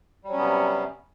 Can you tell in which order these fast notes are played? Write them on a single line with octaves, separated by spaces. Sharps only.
G3 F#3 C#4 B3 C3